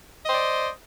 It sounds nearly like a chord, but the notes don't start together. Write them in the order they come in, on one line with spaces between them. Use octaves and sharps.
D#5 C5 D5